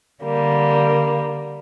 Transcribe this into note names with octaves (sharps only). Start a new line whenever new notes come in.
D3 G3 A#3